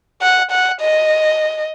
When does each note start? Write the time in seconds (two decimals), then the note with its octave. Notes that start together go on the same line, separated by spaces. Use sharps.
0.22 F#5
0.51 F#5
0.81 D#5